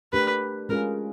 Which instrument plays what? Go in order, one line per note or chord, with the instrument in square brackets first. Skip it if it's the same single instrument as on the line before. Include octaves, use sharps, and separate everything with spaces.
[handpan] A3 D4 G4 A#4 [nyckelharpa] B4
[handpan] G#3 C#4 F4 G#4 [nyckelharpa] A#4